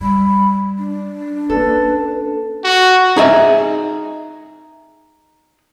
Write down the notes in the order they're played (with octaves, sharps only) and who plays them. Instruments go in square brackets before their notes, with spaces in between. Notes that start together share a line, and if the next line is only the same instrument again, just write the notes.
[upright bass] G3 [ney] B5
[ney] D4
[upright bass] A#3 C#4 [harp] A4 [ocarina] B4
[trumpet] F#4
[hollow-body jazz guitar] D#4 G#4 D#5 E5